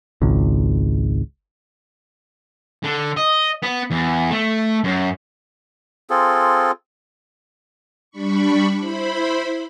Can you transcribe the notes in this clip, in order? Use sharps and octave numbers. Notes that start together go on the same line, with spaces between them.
G#1 C#2
D3
D#5
B3
E2
A3
F#2
C4 F4 G#4 A4
G3 D4 B5 C#6
E4 C5 B5